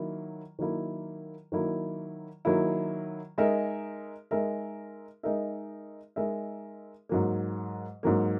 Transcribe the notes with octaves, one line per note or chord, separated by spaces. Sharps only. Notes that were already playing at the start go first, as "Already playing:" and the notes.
Already playing: D#3 F#3 A#3 E4
D#3 F#3 A#3 E4
D#3 F#3 A#3 E4
D#3 F#3 A#3 E4
G#3 D#4 A#4 E5
G#3 D#4 A#4 E5
G#3 D#4 A#4 E5
G#3 D#4 A#4 E5
G#2 F#3 A#3
G#2 F#3 A#3